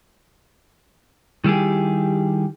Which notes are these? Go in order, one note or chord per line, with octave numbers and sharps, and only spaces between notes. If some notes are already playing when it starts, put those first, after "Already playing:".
D#3 G3 E4 G4 G#4